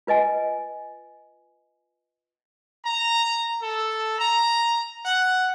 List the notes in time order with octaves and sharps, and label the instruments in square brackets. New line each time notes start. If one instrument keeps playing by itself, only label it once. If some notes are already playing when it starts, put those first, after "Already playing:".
[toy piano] F4 B4 D#5 G#5
[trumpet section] A#5
A4
A#5
F#5